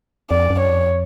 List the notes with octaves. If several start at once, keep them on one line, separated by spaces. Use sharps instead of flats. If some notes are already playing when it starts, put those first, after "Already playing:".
F2 D5
F#2
C#5
F2